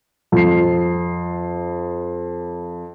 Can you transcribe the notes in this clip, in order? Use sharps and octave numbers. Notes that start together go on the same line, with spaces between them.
F2 C7